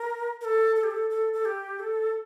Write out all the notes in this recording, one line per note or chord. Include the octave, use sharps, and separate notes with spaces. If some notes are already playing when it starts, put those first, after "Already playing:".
Already playing: A#4
A#4
A4
A4
G4
A4
A4
A4
G4
A4